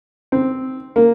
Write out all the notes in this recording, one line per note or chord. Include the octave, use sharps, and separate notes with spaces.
C4
A#3